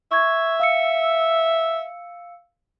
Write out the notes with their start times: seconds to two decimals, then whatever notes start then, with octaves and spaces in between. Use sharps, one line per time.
0.11 E5 C#6 G#6
0.60 F5 E6 C#7